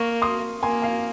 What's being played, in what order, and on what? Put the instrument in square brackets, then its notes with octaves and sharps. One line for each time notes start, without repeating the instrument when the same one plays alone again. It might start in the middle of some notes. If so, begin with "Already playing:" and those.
Already playing: [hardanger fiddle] A#3 [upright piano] C#6 F6
[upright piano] C6 D#6
[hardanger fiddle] A#3 [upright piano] G#5 C6
[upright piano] F5 G#5